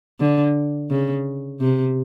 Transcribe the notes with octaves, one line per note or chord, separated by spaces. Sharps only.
D3
C#3
C3